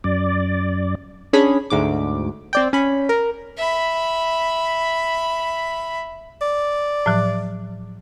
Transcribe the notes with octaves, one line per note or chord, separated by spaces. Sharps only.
F#2 D5
C#4 D4 G#4 B5
D2 G#2 D6
C4 D5 G5
C#4 B5
A#4
E5 B5
D5
A2 F3 F#3